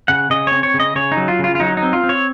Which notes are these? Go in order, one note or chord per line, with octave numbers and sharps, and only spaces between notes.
C#3 F#5
C#3 D#5
C4 C#5
C#5
C#3
D#5
C#3 C#5
D#4
F#3
F4
C#3 F4
F4
F#3 D#4
D#4
C4
F4
C4
C#5